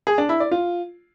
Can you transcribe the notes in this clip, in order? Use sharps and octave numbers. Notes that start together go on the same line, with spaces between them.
G#4
D4
E4
D5
F4